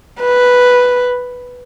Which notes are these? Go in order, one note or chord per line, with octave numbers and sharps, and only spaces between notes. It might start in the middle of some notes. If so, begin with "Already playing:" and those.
B4